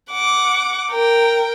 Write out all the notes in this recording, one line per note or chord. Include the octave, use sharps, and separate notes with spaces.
F#5 D6
A#4 G5